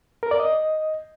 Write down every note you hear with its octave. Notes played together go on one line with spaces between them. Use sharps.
A#4
D5
D#5